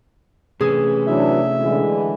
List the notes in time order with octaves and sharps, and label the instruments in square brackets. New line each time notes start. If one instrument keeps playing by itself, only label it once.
[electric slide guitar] C3 A3 C#4 [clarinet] E3 [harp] G#4
[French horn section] E3 F#3 D4 [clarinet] E5
[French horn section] D3 E3 G#3